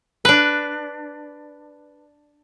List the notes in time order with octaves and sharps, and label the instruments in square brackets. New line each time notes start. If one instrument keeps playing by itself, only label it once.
[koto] D4 B4